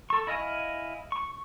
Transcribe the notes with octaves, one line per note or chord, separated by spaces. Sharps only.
A4 C#6
E4 D#5 F5 G#5
C#6